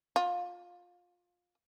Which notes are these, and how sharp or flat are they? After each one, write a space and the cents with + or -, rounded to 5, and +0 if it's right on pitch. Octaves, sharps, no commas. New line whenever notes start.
F4 +20